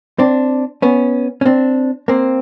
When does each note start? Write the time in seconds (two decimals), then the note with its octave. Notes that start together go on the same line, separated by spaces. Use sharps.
0.19 C4 D4
0.82 B3 C#4
1.41 C#4
1.45 C4 D4
2.08 A#3 C4